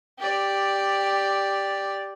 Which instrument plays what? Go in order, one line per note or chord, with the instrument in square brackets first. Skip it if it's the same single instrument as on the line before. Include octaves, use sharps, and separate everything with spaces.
[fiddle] G4 D5